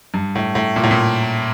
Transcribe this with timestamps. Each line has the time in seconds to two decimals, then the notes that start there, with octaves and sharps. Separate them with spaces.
0.14 G2
0.35 A2
0.55 A2
0.76 A#2
0.83 A2
0.91 A#2